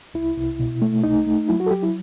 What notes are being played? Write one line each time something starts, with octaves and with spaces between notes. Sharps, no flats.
C2 E4
C2
B2
A3
C2 D#4
A3
F#3 E4
F#4
A4
F#3 G4
E4